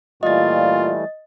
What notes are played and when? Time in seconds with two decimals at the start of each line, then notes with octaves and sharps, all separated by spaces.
0.23 A#2 E3 G3 A3 F4 D#5 A6